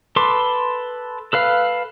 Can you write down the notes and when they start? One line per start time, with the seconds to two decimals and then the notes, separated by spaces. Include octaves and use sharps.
0.16 A4 B4 C6 D6
1.33 A4 B4 F5